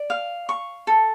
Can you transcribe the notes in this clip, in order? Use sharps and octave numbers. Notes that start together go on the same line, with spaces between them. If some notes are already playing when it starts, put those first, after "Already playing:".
Already playing: D5
F5
C#6
A4